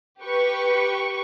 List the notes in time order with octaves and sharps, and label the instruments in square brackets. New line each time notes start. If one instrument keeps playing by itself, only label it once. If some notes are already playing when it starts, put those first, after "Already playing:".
[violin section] G4 B4 C#6